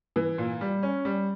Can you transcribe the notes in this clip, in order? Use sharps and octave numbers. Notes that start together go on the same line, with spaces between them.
E3
A#2
G3
C#4
G3